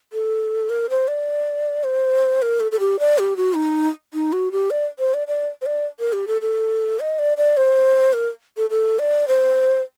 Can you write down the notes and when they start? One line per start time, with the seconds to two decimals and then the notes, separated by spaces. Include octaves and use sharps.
0.13 A4
0.69 A#4
0.90 C5
1.08 D5
1.84 C5
2.42 A#4
2.60 A4
2.72 A4
2.80 G4
2.99 D5
3.18 G4
3.37 F#4
3.56 D#4
4.14 D#4
4.33 F#4
4.52 G4
4.71 D5
4.99 C5
5.14 D5
5.28 D5
5.62 C5
5.66 D5
6.00 A#4
6.13 G4
6.27 A4
6.42 A4
7.00 D#5
7.19 D5
7.37 D5
7.57 C5
8.13 A#4
8.57 A4
8.70 A4
8.99 D5
9.28 C5